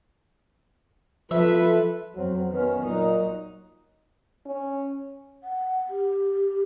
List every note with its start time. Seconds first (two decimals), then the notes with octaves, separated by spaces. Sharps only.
1.31 F3 F4 A4 B4 E5
2.15 F2 F#3 C4
2.50 D#3 B3 C#4
2.83 A#2 F#3 D#4
4.46 C#4
5.43 F#5
5.90 G4